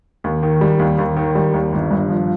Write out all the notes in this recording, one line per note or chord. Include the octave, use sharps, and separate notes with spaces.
D#2
D#3
G3
D#2
D#2
D#3
G3
D#2
G1
G2
F3